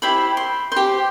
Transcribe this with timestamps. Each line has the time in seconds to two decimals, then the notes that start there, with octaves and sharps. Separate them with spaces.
0.02 E4 G4 C5 B5
0.37 C6
0.72 G4 C5 C6